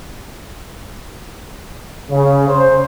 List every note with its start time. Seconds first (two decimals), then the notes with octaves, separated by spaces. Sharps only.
2.11 C#3
2.48 C5